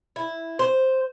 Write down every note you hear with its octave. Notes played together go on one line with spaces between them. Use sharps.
E4
C5